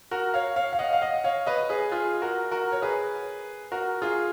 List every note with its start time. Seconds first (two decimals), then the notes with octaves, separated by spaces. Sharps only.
0.11 F#4 A#4
0.34 C#5 F5
0.56 C#5 F5
0.73 F5
0.79 D#5 F#5
0.93 F5
1.02 D#5 F#5
1.24 C#5 F5
1.46 B4 D#5
1.70 G#4 B4
1.91 F4 G#4
2.21 F#4 A#4
2.52 F#4 A#4
2.72 C#5
2.82 G#4 B4
3.72 F#4 A#4
4.02 F4 G#4